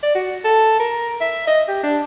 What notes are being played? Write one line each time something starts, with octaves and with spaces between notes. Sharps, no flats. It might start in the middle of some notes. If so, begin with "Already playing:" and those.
D5
F#4
A4
A#4
E5
D#5
G4
D4